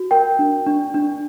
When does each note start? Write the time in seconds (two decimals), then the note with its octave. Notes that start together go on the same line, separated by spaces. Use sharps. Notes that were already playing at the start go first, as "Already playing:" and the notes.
Already playing: F#4
0.11 A#4 G5
0.39 D4
0.66 D4
0.94 D4